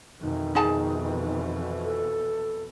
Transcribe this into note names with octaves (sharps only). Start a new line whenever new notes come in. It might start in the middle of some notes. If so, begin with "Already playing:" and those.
F2 B2 D#3 E3
D#4 G#4 A5
A4